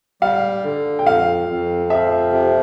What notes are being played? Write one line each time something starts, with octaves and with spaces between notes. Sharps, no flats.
G3 F5
D3
G5
F2 F5
F2
F3 E5
C3